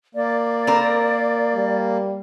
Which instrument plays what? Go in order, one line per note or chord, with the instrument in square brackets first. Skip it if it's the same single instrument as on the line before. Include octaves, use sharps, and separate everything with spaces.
[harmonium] A#3 [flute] D5
[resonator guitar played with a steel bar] C4 A#4
[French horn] G3